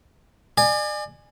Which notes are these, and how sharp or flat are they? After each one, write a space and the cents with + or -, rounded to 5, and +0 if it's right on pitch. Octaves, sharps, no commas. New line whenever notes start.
D5 +40 G#5 +0